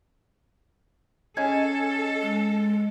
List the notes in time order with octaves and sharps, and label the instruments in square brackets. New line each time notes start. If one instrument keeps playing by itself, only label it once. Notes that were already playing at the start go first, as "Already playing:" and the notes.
[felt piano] C#4 D#5 G#5 [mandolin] G#4 [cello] A4
[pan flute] G#3